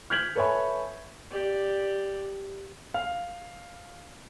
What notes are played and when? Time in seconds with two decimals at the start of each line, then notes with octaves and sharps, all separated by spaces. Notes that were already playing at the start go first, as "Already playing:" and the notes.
0.10 F6 G6 G#6 B6 F#7
0.35 A4 B4 C#5 E5 G#5 B5
1.31 G4 D5
2.94 F5